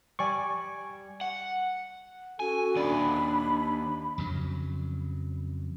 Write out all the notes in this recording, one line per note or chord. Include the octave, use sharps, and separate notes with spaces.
G3 D5 G#5 C#6
F#5
C#4 F#4 A4 G#5
D#2 D4 D5 B5
F2 C#3 F#3